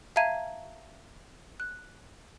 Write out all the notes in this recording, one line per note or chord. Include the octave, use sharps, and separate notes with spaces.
E5 F5 A5 A#5 G#6 D#7
F#6